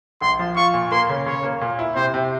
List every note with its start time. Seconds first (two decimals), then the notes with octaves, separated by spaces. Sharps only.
0.21 A#1 C6
0.39 F3
0.57 F4 C#6
0.74 A#2
0.91 A#3 C6
1.09 C#3
1.26 C#3 C#5
1.44 A#3
1.61 A#2
1.79 E4
1.96 C3 C5
2.14 C3